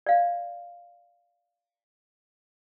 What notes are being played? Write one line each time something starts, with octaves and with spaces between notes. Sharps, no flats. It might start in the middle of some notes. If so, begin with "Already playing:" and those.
D5 F5